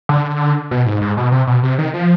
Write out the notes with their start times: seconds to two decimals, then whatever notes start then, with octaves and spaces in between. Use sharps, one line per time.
0.09 D3
0.71 B2
0.86 G#2
1.02 G#2
1.17 B2
1.32 C3
1.47 B2
1.63 C3
1.78 D#3
1.94 F3